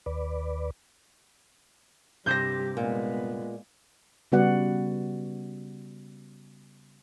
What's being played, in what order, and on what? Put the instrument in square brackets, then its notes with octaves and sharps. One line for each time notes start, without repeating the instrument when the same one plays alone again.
[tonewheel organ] D#2 B4 D5
[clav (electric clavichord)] G2 C3 C5 [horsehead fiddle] G3 G4 [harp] G6 A#6
[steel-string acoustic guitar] A#2 [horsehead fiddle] G#3 B3
[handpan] C#3 G3 B3 F#4 D5 F#5